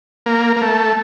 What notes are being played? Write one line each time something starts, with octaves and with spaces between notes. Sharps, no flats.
A#3
A#3
A3